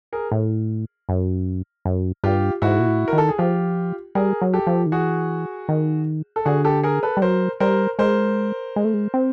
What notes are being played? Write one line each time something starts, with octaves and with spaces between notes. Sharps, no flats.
G#4 A#4
A2
F#2
F#2
G2 F4 G4
G#2 E4 F#4
A#2
A2
A#4
D#3
A4
G#4
F3 F4 G4
G3 G#4 A#4
F#3
G4 A4
F3
D#3
E3 F#4 G#4
D#3
A4
D3 F#4 G#4
G4 A4
G#4 A#4
A4 B4
G3
F#3 A#4 C5
G3 A#4 C5
G#3 A#4 C5
G#3
A3
G#3
C4